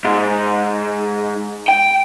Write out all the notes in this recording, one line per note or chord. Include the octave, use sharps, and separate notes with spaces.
G#2
G5